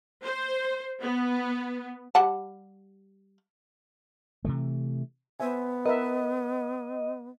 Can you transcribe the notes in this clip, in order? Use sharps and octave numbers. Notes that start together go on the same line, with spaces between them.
C5
B3
G3 F#5 A5
C3 E3 A3
B3 C5 E5 G#5
A#4 B4 D#5 E5